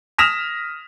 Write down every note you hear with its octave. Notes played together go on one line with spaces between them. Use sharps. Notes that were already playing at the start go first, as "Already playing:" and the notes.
D#6 F6 A#6 B6 E7 F7